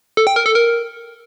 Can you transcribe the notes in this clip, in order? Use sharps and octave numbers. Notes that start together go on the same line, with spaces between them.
A4
G5
A#4
A4
A#4